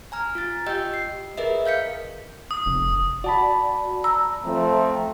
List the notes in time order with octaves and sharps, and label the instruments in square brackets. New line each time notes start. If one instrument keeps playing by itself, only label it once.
[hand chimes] G#5 A#5 F6
F4 A6
F4 G4 D#5 G5 E6 G6
C7
G#4 A#4 B4 D#5 E5
F5 G6 B6 C#7
[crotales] D#6
[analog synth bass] F1
[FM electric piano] F#4 [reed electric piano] D5 A5 B5
[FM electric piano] A#5 [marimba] E6
[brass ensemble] F3 A3 C4